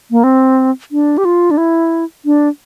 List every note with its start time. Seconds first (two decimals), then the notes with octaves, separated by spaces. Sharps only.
0.11 A#3
0.24 C4
0.92 D4
1.18 G4
1.25 F4
1.51 D4
1.58 E4
2.25 D4